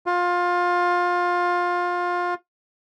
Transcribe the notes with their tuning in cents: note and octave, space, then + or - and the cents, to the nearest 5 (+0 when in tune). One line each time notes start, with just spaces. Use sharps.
F4 +20